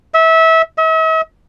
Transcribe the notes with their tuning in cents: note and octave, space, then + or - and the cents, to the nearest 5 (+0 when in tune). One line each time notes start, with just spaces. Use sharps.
E5 -25
E5 -45